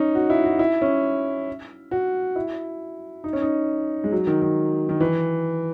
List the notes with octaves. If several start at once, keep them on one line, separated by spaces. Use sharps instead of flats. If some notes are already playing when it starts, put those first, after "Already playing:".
Already playing: C#4 D#4
F#4
E4
F#4
E4
C#4
F#4
E4
D#4
C#4
D#4
G#3
F#3
D#3
D#3
D#3
E3